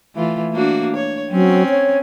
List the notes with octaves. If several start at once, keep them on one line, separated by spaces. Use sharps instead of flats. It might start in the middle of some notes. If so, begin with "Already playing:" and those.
E3 A3 F4
A#3 D4 F#4
C#5
F#3 C4 C#4
C#5